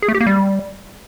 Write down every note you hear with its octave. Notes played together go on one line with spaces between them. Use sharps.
G#4
A3
G4
A#3
G3